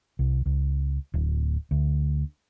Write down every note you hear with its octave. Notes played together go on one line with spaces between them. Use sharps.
C2
C#2
D1
D2